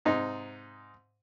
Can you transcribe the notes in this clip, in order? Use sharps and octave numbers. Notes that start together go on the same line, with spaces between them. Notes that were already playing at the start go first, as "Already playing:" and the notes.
G#2 C3 D#4